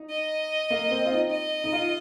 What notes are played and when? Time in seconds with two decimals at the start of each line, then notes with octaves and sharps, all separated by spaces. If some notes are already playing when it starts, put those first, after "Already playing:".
Already playing: D#4
0.10 D#5
0.71 A#3
0.91 C4
1.06 F4
1.12 D#4
1.31 D#5
1.64 D#4
1.72 F4